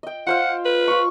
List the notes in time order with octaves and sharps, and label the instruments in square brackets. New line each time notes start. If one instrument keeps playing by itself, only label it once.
[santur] D#5 G5
[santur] F4 C5 F5 [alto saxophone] F#5
[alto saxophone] B4
[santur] F4 C#6